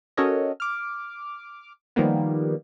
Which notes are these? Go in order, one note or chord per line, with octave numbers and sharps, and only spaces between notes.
C#4 F#4 A4 A#4 C#5 D#5
D6 F6
D#3 F3 G3 A#3 B3